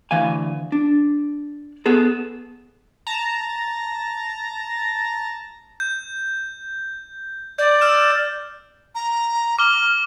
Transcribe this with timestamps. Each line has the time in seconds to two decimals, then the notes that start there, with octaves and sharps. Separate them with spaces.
0.11 D2 E3 F5 G#5
0.72 D4
1.86 B3 G#4 A4
3.07 A5 A#5
5.80 G6
7.59 D5 G6
7.81 E6 F6 E7
8.95 A#5
9.59 D6 F6 G7